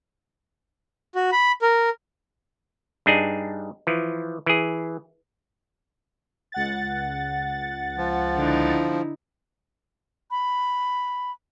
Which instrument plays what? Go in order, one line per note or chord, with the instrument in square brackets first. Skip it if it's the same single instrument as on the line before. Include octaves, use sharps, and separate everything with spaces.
[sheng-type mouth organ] F#4
B5
A#4
[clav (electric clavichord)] G2 D4 D#4 G#4
E3 F3
E3 G#4
[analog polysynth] C#2 F#5 A6
[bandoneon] F3
[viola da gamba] D3 D#4 E4
[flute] B5